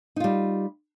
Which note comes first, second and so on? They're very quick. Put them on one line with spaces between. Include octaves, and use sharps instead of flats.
D#4 F4 G3